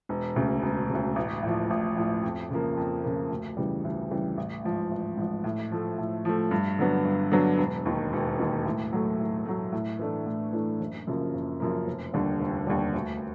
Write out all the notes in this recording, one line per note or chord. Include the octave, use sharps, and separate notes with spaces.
E1
D2 C#3
E1
C#3
D2
A1
A2 F3
A1
A2 F3
F2
C#3 F3 A#3
F2
C#3 F3 A#3
D2
C#3 E3 G3
D2
C#3 E3 G3
A1
G#2 F3
A1
G#2 F3
A2
F3 A3
A2
F3 A3
G2
D3 F#3 B3
G2
D3 F#3 B3
E1
D#2 D#3
E1
D#2 D#3
A2
F#3 A3
A2
F#3 A3
A2
E3 A3 D4
A2
E3 A3 D4
F#1
F#2 C#3 F3 A#3
F#1
F#2 C#3 F3 A#3
F1
D#2 D3 G3
F1
D#2 D3 G3
D2